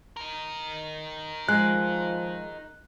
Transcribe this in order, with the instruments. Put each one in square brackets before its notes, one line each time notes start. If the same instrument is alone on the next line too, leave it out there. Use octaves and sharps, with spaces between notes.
[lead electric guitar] D#4 A#4
[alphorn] F3 [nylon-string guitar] G#3 [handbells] F#6